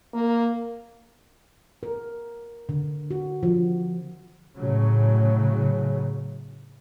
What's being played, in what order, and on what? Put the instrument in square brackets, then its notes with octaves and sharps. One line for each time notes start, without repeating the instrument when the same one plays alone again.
[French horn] A#3
[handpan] A#4
D3
F#4
F3
[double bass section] A2 C#3 F#3